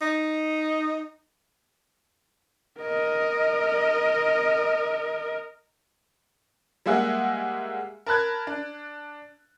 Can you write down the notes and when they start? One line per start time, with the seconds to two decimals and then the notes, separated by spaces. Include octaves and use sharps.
0.01 D#4
2.80 A#4 D#5
6.86 G3 G#3 A#3 G#4 E5 F#5
8.06 A#4 A5 B5 F#6 G#6
8.47 D4